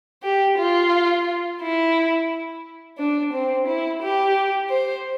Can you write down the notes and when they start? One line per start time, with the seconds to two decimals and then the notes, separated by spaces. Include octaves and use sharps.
0.23 G4
0.58 F4
1.61 E4
2.98 D4
3.33 C4
3.67 E4
4.02 G4
4.70 C5